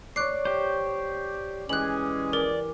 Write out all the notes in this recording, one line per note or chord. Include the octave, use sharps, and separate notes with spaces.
C#5 D5 F#6 C7
G4 C5
E3 G#3 C#4 G4 G#4 F#6 F#7
A#4 D5